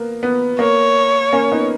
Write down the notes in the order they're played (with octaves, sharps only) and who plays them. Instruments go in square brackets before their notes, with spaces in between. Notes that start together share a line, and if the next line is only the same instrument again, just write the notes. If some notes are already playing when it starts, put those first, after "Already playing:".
Already playing: [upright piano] A#3 B3
B3
[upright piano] A#3 [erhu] C#5
[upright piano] A#3 C#4
B3 D#4